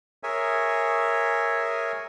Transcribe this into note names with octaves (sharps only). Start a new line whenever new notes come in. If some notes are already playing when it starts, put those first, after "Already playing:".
G#4 A#4 C#5 E5 G#5